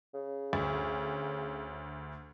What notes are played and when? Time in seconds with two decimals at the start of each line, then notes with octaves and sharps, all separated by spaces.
0.14 C#3
0.53 D2